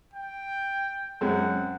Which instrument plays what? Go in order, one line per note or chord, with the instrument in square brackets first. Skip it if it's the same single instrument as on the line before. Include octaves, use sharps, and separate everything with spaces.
[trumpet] G5
[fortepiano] F#2 G#3 C4 [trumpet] F#5